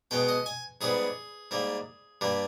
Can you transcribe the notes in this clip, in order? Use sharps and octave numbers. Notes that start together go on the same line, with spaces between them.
B2 G#3 B3 G5
D#5
G#5
G#2 G3 B3 G#4
G#2 G3 A#3
G2 G3 A#3